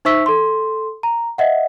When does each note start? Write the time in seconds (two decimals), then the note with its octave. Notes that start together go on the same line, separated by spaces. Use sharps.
0.05 D#4 C5 E5 C#6 E6 B6
0.26 A4 C6
1.03 A#5
1.38 D#5 E5 F#5